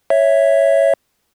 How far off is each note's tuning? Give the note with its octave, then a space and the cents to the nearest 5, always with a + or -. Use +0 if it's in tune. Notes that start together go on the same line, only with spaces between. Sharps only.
C#5 +0 E5 +0